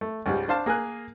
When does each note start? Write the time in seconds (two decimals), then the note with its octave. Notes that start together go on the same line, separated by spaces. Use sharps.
0.01 A3
0.26 C#2 G#2 G3
0.48 D4 C5 F5 A5
0.66 A#3 G#4 A#4 G#5 F#6